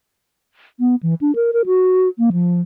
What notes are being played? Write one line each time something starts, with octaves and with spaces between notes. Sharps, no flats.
B3
E3
D4
A#4
A#4
F#4
A#3
F3